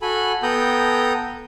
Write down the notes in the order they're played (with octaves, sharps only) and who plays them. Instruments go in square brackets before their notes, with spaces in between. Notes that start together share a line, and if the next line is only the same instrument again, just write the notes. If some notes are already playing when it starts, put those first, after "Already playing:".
[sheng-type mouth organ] F#4 A4 G#5 B5
B3 A4 G5 A#5 D#6 G6